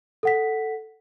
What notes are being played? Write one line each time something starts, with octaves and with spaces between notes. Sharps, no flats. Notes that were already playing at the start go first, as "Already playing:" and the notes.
A4 F#5 B6